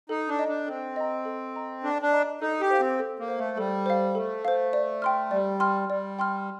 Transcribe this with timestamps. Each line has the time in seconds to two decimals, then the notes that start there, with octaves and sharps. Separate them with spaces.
0.09 D#4 A4
0.29 D4
0.39 D#5 A#5
0.48 D4
0.67 C4 A4
0.96 D#5 A#5
1.25 A4
1.55 D#5 A#5
1.83 D4 A4
2.02 D4
2.12 D#5 A#5
2.41 D#4 A4
2.61 G4
2.70 C5 F5
2.80 C4
2.99 A4
3.19 A#3
3.28 C5 F5
3.38 A3
3.57 G3 A4
3.86 C5 F5
4.15 A3 A4
4.45 C5 F5
4.73 D5
5.02 G5 C6 F6
5.31 G3 D5
5.60 G5 C6 F6
5.89 G3 D5
6.19 G5 C6 F6